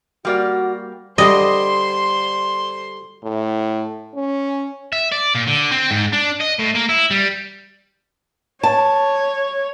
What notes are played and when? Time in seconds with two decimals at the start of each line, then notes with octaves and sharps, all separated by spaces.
0.25 G3 A#3 F#4 D5
1.18 D3 G3 C5 D#5 C6
3.23 A2
4.15 C#4
4.93 E5
5.12 D5
5.35 A#2
5.48 D3
5.71 C4
5.91 G#2
6.12 D4
6.40 D#5
6.59 A2
6.75 A#3
6.89 E4
7.11 G3
8.63 C#5 A5